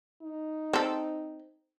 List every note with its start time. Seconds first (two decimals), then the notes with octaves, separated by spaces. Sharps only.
0.22 D#4
0.73 C4 A4